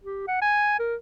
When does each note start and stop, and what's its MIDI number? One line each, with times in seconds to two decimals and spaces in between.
0.04 0.27 67
0.28 0.39 78
0.42 0.77 80
0.79 0.95 70